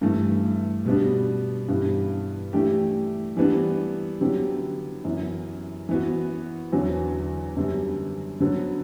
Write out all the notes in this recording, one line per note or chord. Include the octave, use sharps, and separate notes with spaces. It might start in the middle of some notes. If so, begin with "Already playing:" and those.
G2 E3 A3
B2 G3 B3 D4
G2 E3 G3 B3 D4
E3 A3 D4 G4
E3 G3 B3 D4
D3 F#3 B3 E4 G4
F#2 E3 B3
E3 B3 F#4
E2 D3 F#3
F#2 D3 G3 B3
D3 F#3 B3